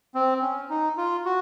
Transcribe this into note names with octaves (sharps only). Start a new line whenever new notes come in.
C4
C#4
D#4
F4
F#4